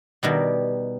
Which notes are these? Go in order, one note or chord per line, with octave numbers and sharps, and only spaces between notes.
B2 D#3 G3